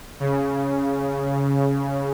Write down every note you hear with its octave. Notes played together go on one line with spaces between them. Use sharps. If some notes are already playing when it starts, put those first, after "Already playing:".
C#3